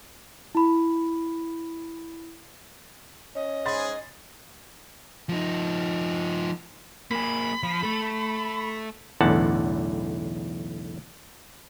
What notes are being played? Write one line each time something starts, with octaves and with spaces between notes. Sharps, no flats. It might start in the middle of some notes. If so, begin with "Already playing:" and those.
E4 B5
C#4 D#5
G#2 G#4 B5 C6 A6
F3 D#4
A#3 G#4 B5
F3
A3 A4
B1 E2 A2 D3 F#5 A5